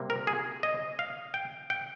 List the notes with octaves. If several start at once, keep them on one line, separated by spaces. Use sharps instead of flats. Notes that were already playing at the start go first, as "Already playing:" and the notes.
Already playing: C3 G3 A#3
A#4
G#4
D#5
F5
G5
G5